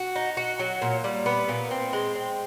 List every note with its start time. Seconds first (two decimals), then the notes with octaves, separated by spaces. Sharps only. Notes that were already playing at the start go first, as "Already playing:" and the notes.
Already playing: F#4
0.15 D#4
0.37 F#4
0.59 F#3
0.82 A#2
1.04 G3
1.26 B3
1.49 A#2
1.71 C4
1.93 G#3
2.15 C4